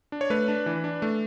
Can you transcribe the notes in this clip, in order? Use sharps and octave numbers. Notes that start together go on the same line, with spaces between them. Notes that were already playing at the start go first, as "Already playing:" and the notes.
D4
C#5
A3 B4
D4
E3
D4
A3